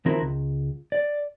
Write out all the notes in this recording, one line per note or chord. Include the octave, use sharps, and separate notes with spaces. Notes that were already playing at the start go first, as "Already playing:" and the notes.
D#3 F3 C4 E4 F#4 A#4
C#2
D5